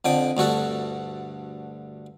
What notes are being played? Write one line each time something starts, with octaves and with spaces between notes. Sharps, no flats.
F2 D3 G5 D#6
D2 G2 F#4 A4